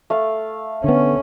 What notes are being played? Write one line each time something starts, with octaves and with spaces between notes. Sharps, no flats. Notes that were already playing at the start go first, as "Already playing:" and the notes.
A3 F5
D3 B3 C#4